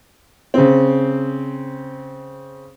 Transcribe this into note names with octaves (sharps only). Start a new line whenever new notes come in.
C#3 C4